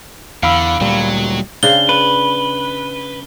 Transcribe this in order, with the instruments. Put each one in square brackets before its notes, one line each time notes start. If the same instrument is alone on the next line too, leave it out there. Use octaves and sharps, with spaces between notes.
[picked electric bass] E2 [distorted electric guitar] D3 [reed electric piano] F5 B5 E6
[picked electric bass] D2 A#2 G3 [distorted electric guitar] F#3
[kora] C#3 D4 C5 [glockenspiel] G7
[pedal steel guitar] B4